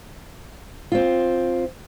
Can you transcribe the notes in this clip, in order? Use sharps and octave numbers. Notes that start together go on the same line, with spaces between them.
C4 F4